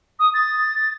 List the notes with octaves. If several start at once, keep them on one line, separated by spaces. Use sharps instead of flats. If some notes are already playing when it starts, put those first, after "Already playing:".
D#6
A6